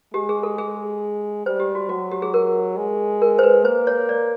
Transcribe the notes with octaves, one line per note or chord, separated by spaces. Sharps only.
G#3 G4
G#4
A4
G#4
G3 C5
G4
F#4
F#3 F#4
G4
G#4
A#4
G#3
A#4
C5
B4
A#3 C5
C#5
D5